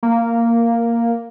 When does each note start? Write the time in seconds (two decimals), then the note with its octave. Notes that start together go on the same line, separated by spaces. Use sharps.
0.03 A#3